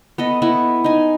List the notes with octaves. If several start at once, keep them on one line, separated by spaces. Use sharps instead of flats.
B3 A4 D#5
B3 E4
D#4 G#5